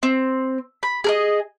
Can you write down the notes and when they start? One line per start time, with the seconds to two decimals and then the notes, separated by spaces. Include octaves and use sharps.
0.03 C4
0.83 B5
1.04 G#4 A#4 D#5